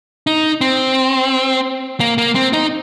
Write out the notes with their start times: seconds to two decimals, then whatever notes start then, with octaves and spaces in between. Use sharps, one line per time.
0.27 D#4
0.61 C4
2.00 A#3
2.18 A#3
2.35 C4
2.53 D#4